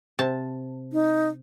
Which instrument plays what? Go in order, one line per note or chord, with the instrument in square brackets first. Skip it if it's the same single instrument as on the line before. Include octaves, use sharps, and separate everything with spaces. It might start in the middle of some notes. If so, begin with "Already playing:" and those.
[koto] C3 A5
[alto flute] D#4